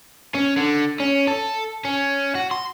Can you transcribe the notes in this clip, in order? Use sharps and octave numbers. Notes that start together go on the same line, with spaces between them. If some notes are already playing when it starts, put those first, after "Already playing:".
C#4
D3
C#4
A4
C#4
F#4
C6